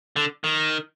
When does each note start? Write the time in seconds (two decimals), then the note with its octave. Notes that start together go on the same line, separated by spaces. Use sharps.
0.16 D3
0.44 D#3